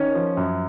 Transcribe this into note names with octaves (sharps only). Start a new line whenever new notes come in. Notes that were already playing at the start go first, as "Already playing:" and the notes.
Already playing: D#3 C#4
F3
F#2